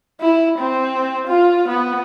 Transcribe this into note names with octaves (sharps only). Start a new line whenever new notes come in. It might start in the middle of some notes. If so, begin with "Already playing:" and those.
E4
C4
F4
B3